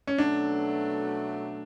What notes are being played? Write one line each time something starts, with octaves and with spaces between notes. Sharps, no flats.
C#4
B2 F#3 A3 D4